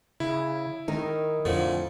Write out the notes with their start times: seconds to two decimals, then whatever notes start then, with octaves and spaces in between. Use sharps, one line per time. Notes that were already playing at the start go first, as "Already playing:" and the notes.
0.20 C#3 E4
0.88 D#3 D#4 A#4
1.45 F2 A2 D3 F3